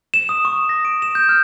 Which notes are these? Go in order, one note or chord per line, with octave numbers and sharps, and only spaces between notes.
E7
D#6
C#6
A#6
D7
E7
G6
F6